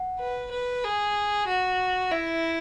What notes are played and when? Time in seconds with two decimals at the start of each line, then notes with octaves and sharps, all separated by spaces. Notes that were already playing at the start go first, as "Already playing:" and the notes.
Already playing: F#5
0.19 B4
0.51 B4
0.84 G#4
1.47 F#4
2.11 E4 E5